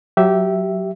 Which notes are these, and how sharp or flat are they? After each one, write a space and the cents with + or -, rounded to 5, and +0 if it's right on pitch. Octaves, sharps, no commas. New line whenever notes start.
F#3 +0 G4 -20 E5 +0